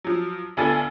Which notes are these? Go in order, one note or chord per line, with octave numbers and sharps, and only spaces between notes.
F3 F#3
D2 B3 F4 A4 G#5 A6